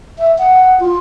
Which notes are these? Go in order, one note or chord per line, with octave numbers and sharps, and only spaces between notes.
E5
F#5
F4